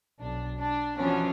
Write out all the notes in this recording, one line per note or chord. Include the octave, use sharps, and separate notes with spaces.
B1 D4
D4
B2 E3 F3 B3 C#4 D4